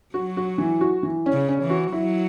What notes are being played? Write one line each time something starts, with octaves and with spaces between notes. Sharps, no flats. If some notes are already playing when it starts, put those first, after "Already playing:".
F#3 F#4
F#4
E3
F#4
E3
C#4
C#3
C#4
E3
F#4
F#3 E4